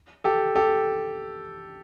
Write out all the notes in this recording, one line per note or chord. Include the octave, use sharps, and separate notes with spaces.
G4 A4
G4 A4